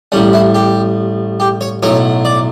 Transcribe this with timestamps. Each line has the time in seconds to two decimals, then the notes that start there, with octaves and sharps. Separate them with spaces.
0.12 G3 C#4
0.15 A1 A2
0.33 E4
0.54 G4
1.40 G4
1.61 C#5
1.83 B1 A2 F#3 C#5
2.25 D5